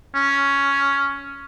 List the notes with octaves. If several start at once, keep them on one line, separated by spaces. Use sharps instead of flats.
C#4